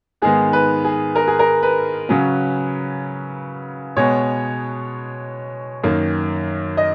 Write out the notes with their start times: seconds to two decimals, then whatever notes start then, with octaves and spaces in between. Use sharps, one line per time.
0.22 G#2 D#3 G#3 B3 G#4
0.53 B4
0.85 G#4
1.16 A#4
1.28 G#4
1.39 A#4
1.63 B4
2.09 C#3 F#3 C#4
3.96 B2 G#3 B3 C#5
5.83 F#2 D#3 A#3
6.77 D#5